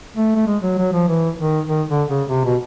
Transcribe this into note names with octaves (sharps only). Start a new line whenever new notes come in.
A3
A3
G#3
F#3
F#3
F3
E3
D#3
D#3
D3
C#3
C3
B2